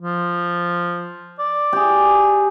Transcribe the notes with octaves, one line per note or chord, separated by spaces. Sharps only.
F3
D5
G4 G#4